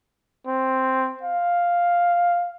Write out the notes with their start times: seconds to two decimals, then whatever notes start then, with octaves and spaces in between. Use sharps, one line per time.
0.47 C4
1.23 F5